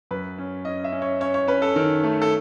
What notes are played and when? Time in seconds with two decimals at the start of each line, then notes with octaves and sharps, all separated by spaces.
0.11 F#2 B4
0.38 C#4
0.65 C#4 D#5
0.84 E5
0.92 C#4
1.02 C#5
1.20 C#4 C#5
1.34 C#5
1.48 C#4 B4
1.62 A4
1.76 D#3
2.04 A3
2.22 A4